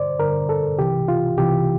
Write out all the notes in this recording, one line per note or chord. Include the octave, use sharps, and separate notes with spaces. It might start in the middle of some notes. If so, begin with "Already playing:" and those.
Already playing: G2 D3 C5 D5
G2 D3 A#4
A4
C2 C3 E3 G4
F4
C2 C3 E3 G4